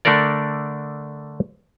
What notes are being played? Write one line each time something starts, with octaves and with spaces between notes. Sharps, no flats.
D3 A3 D4 A4 A#4 D5